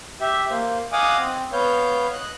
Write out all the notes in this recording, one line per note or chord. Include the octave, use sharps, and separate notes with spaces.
G4 E5
A#3 C5
D#5 F5 F#5 G#5 D6 D#6
C4
B3 B4 C#5 F5 G6
D#5 F#6